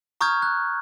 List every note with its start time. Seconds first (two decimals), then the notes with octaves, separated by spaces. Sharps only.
0.21 A#5 C#6 D#6 F6 G6 G#6
0.42 F#6